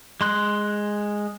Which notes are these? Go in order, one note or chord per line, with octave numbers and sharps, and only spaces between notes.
G#3 C6 F#6